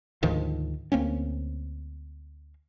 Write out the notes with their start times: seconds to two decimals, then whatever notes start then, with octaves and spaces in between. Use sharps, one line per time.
0.23 D2 G#2 D#3 F3
0.92 D2 A#3 C4 C#4